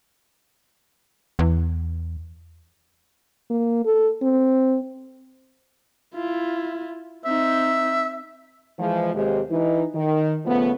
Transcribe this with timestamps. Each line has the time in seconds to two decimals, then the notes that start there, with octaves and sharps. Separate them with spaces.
1.39 E2
3.50 A#3
3.85 A4
4.22 C4
6.14 E4 F4
7.25 C4 D#4 E5
8.79 E3 F3 G#3
9.14 D#2 C3 G#3
9.50 E3 D#4
9.93 D#3
10.45 C#3 F3 A3 B3